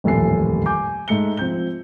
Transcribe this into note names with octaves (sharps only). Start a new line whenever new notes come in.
D#1 A1 F2 A4 G#5 C7
G#5 D6 G6
G#2 A3 C#7 G7
F3 C4 G6 G7